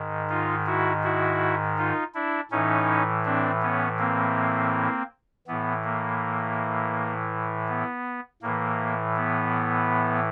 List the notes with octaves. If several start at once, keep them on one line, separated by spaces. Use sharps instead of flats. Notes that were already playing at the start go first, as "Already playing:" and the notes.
Already playing: G#2 D#3
D#4 F4
E4 F#4
E4 F#4
D#4 F4
D4 E4
A2 E3 C#4 D#4
C4 D4
B3 C#4
A#3 C4
A2 E3 B3
A#3
B3
A2 E3 A#3
B3